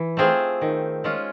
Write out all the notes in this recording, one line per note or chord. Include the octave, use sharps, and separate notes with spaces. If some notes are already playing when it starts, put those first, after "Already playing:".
Already playing: E3
A3 C4 F4 G#4
D#3
G#3 C#4 F4